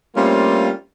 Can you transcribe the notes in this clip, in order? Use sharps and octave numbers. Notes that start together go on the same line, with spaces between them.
G3 A3 A#3 C4 C#4 F4